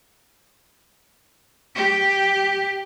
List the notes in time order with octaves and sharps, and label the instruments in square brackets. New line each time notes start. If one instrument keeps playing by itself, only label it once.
[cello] G4